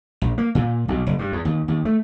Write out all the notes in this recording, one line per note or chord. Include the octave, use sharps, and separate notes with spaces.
A#1
A#3
A#2
B1
F#1
G2
E2
D#2
D#2
A3